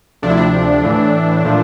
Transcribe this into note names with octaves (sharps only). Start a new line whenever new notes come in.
D2 C3 F3 A3 D4
E4
D4
A2 E3 A3
A#2 F3 A3